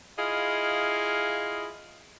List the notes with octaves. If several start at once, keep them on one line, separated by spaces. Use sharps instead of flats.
E4 F4 G#4 D#5 F5